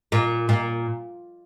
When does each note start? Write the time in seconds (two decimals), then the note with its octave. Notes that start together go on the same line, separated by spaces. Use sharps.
0.12 A#2
0.49 A#2